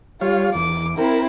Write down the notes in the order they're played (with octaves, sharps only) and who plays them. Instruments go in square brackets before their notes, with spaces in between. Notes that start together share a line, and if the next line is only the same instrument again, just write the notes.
[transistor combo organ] G3 C#5 F5 [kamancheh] F4
[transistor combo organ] E2 [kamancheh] D6
[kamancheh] C4 E4 [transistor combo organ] A#4